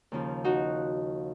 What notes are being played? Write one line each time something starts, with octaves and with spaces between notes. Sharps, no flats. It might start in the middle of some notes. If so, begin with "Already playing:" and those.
D#2 C#3 F3
D#4 F#4